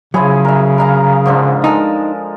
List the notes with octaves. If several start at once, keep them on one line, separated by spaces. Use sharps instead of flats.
C#3 F3 F#3 E4 G#4
A#4 E5
A#4 F5 A#5
G#2 D3 F3
G#3 D#4 A4 A#4